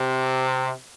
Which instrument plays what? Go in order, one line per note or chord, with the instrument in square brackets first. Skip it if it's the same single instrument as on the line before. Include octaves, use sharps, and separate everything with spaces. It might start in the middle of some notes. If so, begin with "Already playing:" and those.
Already playing: [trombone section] C3